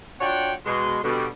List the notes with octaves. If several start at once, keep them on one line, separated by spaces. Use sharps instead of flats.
D4 F4 F#4 C#5 F#5 G5
B2 G#3 C6
B2 D3 G3